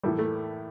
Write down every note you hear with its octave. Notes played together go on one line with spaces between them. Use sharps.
A2 E3 G3 A#3 E4 A4
A3